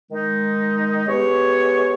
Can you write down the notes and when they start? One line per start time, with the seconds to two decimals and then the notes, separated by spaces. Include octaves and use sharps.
0.11 D#3 G#3 D#4
1.07 G#3 B3 G4 C#5